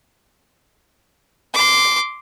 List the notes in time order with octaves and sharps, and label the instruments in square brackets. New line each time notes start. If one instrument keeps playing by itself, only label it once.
[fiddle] C6 D6